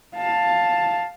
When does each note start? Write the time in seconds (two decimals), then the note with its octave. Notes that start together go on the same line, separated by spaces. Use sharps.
0.15 F5 A5